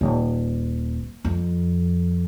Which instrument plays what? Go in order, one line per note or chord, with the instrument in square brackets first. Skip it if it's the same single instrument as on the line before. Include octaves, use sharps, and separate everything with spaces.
[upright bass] D#1
F2